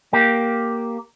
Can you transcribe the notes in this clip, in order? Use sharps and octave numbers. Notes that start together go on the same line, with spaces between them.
A#3 G4